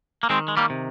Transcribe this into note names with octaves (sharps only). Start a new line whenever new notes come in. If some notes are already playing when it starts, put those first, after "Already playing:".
A#3
D#3 G#3 C4
G#3
G3 A#3
C3